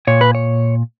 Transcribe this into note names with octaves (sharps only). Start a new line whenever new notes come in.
A#2 C#5
B4
C#5